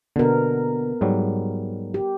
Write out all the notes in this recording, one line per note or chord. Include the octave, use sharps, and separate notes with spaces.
B2 D3 B3 A#4
G#2 F#3 G3
G4